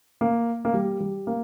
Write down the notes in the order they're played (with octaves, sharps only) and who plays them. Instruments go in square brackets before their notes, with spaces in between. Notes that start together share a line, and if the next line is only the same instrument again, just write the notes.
[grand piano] A#3
A#3
G3
G3
A#3